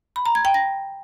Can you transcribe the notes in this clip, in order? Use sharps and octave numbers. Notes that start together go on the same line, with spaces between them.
B5
A#5
G#6
G5
A#6